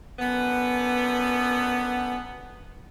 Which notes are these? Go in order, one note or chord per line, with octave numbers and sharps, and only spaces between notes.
F#2 D3 B3